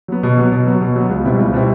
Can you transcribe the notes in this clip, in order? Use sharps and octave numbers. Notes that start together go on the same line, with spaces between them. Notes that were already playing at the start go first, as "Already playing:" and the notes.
F#3 B3
B2
F#3 B3
B2
F#3 B3
B2
F#3 B3
C#2
B2 G3 C4 E4
C#2
B2 G3 C4 E4